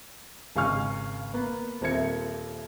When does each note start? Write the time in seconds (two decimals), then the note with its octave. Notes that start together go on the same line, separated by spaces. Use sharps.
0.56 G#1 C#3 F5 G#5 C#6 F6
1.34 A#3 B3
1.81 D#1 C4 A#4 E5 G#6 C#7